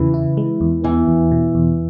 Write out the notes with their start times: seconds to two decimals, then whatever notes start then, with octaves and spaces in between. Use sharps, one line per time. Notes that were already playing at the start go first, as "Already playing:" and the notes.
Already playing: E2 C#3 E3
0.14 E4
0.37 G#3
0.61 E2
0.84 E3 B3
1.08 E2
1.31 B2
1.55 E2